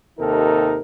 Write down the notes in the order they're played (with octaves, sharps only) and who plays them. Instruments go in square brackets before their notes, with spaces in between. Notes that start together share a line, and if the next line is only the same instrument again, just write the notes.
[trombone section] D#2 C3 D#4 A4 A#4